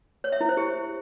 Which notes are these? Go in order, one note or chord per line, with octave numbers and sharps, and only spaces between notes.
C#5
E5
E4
C5
G4